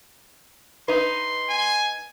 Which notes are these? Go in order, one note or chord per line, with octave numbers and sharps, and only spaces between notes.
D#4 B4 C6
G#5